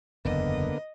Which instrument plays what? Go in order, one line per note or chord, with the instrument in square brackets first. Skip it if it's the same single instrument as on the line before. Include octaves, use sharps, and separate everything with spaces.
[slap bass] F#1 E2 [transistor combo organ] D3 A#3 B3 [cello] D#5